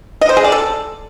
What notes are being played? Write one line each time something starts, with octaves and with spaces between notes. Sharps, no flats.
D#5
C5
G#4
D5
A4